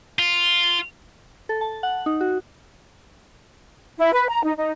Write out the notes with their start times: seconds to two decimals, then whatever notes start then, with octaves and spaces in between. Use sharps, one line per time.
0.19 F4
1.49 A4
1.61 A5
1.83 F#5
2.06 D#4
2.21 F#4
3.99 E4
4.14 B4
4.28 A#5
4.44 D#4
4.56 D#4